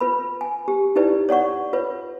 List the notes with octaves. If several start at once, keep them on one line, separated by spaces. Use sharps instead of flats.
F4 B4 B5
G#5
G4
D#4 E4 G4 B4 D5
C#5 D5 F#5 C#6
F4 B4 C#5